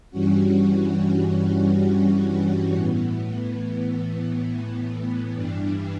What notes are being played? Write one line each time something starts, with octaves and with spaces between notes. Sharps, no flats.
G2 E3 G3 C#4 F#4
A2 E3 B3
G2 E3 G3 D4